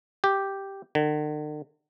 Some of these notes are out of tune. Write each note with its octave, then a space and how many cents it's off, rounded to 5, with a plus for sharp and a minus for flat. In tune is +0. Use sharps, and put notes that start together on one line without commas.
G4 +0
D3 +45